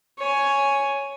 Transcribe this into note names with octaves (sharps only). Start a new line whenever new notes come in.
C#5 G#5